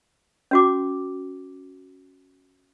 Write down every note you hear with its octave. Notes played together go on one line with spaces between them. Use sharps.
C#4 F#4 D6